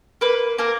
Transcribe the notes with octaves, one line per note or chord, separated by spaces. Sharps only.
A#3 B4
A#3 A#4